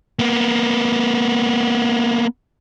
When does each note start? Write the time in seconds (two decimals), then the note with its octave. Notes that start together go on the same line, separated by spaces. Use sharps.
0.19 A#3 B3